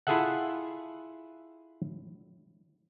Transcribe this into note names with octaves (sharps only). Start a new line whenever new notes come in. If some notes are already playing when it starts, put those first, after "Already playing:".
E4 F4 G#4 A4 E5 F#5